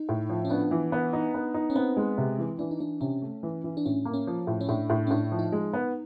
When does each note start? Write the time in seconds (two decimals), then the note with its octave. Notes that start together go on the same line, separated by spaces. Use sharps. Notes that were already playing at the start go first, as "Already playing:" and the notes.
Already playing: D#4
0.09 A2
0.29 F3
0.45 C#4
0.50 B3 D4
0.71 E3
0.92 B3
1.13 D#4
1.34 B3
1.54 D#4
1.70 C#4
1.75 B3 C4
1.97 G#3
2.18 C3
2.38 E3
2.59 E3 D4
2.71 D#4
2.80 E3 D4
3.01 C3 C#4
3.22 A3
3.43 E3
3.64 E3
3.77 D4
3.85 A2 C#4
4.05 A#3
4.14 C#4
4.27 F3
4.47 A2
4.61 C#4
4.69 A2 D4
4.90 A2
5.07 C#4
5.11 A2 D4
5.24 D4
5.32 F3
5.39 D#4
5.52 G#3
5.73 B3